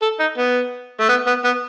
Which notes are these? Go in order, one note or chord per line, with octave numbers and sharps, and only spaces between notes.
A4
D#4
B3
A3
B3
B3
B3